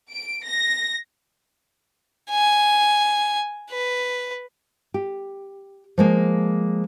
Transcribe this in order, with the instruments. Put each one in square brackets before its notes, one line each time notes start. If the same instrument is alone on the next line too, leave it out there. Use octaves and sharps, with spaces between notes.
[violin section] D7
A#6
[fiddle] G#5
B4
[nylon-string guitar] G4
F3 G#3 A#3